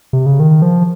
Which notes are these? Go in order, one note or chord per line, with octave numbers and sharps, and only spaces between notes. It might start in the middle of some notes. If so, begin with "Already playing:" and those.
C3
C#3
D#3
F3